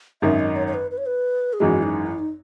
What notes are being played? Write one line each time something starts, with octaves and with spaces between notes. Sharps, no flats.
G#1 F#2 D#3 E5
D#5
C#5
C#5
B4
B4
C#5
B4
G#4
G#1 F#2 E3 G#3 F#4
D#4
E4
D#4